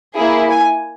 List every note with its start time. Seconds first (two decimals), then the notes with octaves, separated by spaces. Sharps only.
0.16 A#3 E4 G#4
0.50 G#5